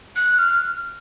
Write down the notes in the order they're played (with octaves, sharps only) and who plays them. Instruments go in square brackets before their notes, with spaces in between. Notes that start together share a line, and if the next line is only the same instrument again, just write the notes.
[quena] F#6
F6